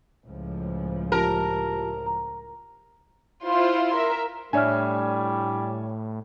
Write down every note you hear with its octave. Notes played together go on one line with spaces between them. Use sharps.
C#2 A2 F3
F4 G4 A#4 A5
A#5
E4 F4 C5 C6
A#4 E5
A2 G3 D4 C#5 D5 E5 G#5 F6